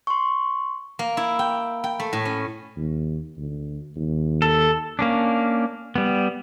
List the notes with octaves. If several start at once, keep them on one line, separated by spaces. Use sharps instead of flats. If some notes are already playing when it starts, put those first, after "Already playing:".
C6 C#6
A#3
E4
G5
G5
A3
A2
C#4
D#2
D2
D#2
A4
A#3 C#4 D4
G3 B3